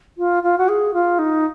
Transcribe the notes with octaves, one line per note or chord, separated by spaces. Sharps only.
F4
F4
F#4
G#4
F4
D#4